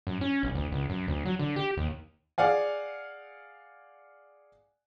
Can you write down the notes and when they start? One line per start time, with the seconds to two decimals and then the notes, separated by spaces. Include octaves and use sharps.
0.07 F#2
0.21 C#4
0.43 B1
0.55 D2
0.72 C#2
0.89 F#2
1.08 D2
1.25 F#3
1.39 D3
1.56 G4
1.77 D#2
2.38 G#4 D5 F5 F#5 G#5